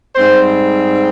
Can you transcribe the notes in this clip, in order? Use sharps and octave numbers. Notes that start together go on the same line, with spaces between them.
G#2 G3 C4 C5